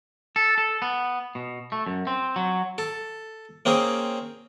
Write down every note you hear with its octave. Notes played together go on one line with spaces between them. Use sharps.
A4
A4
B3
B2
A3
F#2
C4
F#3
A4
A#3 C4 C#4 G#4